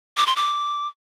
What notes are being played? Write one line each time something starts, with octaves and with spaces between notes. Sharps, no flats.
D6
C6
D6